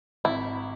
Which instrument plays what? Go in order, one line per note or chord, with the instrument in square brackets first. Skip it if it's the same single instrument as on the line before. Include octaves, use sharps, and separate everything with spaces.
[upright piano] G#1 [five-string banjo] E4